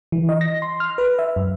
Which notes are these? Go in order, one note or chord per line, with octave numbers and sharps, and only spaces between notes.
E3
D#5
A#6
C6
F6
B4
E5
F#2